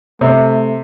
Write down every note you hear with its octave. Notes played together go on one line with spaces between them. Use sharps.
C3 A3